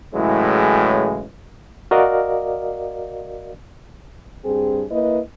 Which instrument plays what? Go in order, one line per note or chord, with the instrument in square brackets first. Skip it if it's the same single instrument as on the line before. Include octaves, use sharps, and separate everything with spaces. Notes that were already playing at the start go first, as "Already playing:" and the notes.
[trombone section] A2 C#3 E3 F#3 G#3
[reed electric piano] F#4 A#4 D5 D#5 F5
[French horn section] G2 C4 G#4
A#3 E4 B4 D#5